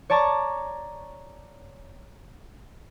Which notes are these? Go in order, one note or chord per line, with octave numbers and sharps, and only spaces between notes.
C#5 D5 A5 A#5 C#6 D6